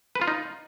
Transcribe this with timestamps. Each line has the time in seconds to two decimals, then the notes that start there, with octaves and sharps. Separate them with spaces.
0.15 B4
0.21 F4
0.28 D#4